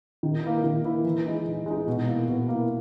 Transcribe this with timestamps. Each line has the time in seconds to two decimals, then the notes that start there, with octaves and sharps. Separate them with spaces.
0.23 D#3
0.43 A#3 E4
0.64 D#3
0.85 A#3 E4
1.04 E3
1.26 G#3 D#4
1.47 E3
1.66 G#3 D#4
1.87 B2
2.07 A#3 E4
2.28 B2
2.49 A#3 E4